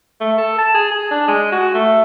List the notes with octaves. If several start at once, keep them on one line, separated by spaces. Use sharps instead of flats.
A3
A4
A5
G#4
G#4
D4
G#3
F#4
A3